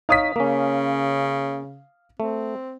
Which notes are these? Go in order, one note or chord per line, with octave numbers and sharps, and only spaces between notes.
D#4 C#5 F5 D#6 B6
C#3 A#3 C#4
A3 C4